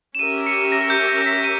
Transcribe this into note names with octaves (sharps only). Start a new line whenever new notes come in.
E7
C#4 G4 A#4 E5 D#7
C#7
A#6
G6
A#6
A#6
B6
D#7